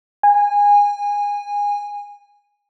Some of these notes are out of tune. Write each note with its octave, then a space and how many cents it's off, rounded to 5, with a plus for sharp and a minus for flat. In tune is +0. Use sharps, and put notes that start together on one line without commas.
G#5 -20